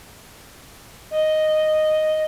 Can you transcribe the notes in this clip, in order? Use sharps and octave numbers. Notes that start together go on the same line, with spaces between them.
D#5